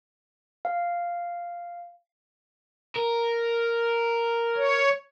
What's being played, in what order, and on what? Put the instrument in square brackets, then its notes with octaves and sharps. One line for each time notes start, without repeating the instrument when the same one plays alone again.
[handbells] F5
[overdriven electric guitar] A#4
[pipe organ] C#5